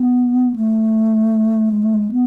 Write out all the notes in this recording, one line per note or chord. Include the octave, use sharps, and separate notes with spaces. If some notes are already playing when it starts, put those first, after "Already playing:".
Already playing: B3
A3
G#3
A3
G#3
B3